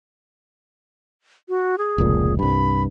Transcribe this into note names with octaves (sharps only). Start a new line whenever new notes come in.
F#4
G#4
F1 C#2 A#2
C2 G2 B5